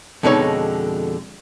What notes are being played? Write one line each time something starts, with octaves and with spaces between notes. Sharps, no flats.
F2 B2 D3 G#3 D#4 C#5